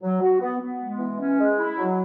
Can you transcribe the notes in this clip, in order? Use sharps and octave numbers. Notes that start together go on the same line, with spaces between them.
F#3
F#4
B3
B3
G#3
E3
C#4
G#3
E4
F#3